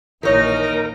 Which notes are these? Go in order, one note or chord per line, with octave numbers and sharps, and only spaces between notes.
A#1 D#2 E3 D#4 A#4 C#5 F6